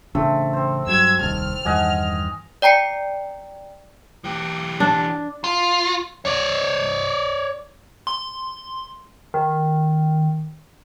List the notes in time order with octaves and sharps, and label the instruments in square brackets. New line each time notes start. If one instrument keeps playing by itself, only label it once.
[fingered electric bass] A1 C#3 D4 [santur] A3 C4
[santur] C4 C5
[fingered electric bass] G2 F#3 [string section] E6 G#6
[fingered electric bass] D#1 C2 D#3 [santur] A5 [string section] F6
[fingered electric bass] E2 G2 D#3 [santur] D#5 F#5 G#5
[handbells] D5 G5 A#5 C7 C#7
[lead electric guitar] E3 G4
[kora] D4
[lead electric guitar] F4
C#5 D5
[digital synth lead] C6
D#3